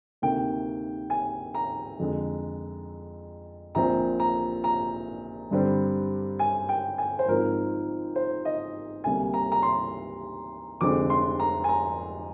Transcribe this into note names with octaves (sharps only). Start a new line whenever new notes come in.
D2 C3 D#3 A#3 G5
G#5
A#5
F2 D3 G#3
A#1 A#2 F3 C4 A#5
A#5
A#5
G2 D3 G3 C4
G#5
G5
G#5
C5
G#1 G#2 F3 C4 A#4
C5
D#5
D2 C3 G3 A#3 G#5
A#5
A#5
C6
F1 F2 D3 G#3 C4 D6
C6
A#5
G#5
A#5